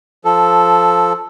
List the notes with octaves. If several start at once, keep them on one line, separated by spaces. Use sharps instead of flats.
F3 A4